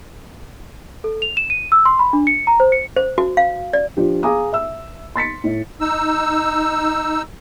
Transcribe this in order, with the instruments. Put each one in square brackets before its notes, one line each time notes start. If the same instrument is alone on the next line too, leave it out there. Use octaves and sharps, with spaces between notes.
[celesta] A4
F7
E7
D#7
E6
C6
B5
D4
C#7
A#5
C5
C#7
[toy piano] C5
F#4
F5
D5
[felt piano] F3 D4 G4
G#4 F5 G#5 A#5 D6 D#6
E5 E6
C6 A6 B6 C#7
A2
[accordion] D#4 E6